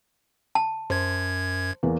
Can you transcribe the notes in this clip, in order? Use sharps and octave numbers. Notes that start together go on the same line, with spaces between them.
A5
F#2 C5 G#6
E2 E3 A#3